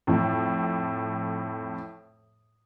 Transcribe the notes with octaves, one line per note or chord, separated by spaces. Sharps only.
F2 A2